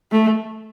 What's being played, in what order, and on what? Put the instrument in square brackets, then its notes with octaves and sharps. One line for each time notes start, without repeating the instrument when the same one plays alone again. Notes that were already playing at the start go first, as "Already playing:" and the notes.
[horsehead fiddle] A3